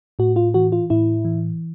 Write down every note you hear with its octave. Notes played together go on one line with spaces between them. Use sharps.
A2 F#4
F4
E3 F#4
F4
A2 E4
E3